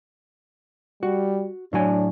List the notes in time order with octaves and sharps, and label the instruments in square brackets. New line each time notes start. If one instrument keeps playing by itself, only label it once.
[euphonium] G3 [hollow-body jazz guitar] F#4
[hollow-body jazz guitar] A2 F#3 G#5 [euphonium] D4